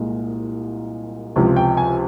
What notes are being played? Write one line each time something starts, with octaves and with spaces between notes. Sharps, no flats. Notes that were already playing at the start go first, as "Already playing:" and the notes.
Already playing: C2 A#2 G#3
C#2 C3 F3
G5
G#5